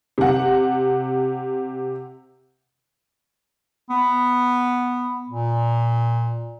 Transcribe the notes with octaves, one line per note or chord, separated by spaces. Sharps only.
C3 F#5
B3
A#2